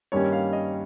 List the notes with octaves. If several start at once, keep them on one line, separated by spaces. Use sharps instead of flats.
G2 D#3 G3 A#3 C#4 C#5
F5
D#5